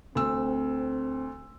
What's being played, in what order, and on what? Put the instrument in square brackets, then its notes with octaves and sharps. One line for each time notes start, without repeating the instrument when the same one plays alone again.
[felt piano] D2 E6 [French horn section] C4